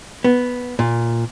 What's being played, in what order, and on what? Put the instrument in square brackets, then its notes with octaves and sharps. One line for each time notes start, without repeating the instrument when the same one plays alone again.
[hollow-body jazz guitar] B3
A#2